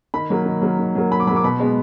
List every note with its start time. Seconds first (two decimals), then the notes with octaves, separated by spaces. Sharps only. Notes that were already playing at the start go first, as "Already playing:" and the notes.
0.14 D#3 B5
0.30 F#3 A#3
0.46 D#3
0.62 F#3 A#3
0.79 D#3
0.95 F#3 A#3
1.11 D#3 B5
1.20 D6
1.27 F#3 B5
1.31 A#3 D6
1.44 B2 B5
1.60 G#3 B3